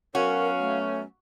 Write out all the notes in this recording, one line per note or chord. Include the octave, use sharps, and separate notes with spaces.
F#3 B3 C#4 F#4 A#4 F5
A3